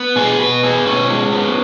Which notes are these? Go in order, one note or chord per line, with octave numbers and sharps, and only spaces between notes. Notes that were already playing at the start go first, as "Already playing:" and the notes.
Already playing: B3
B2 G#4
B2 B4
B3 G#4
B2 C#4
G#3
B3